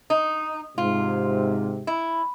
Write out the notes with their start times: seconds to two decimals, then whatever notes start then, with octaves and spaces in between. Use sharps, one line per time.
0.10 D#4
0.78 G#2 C3 F4
1.87 E4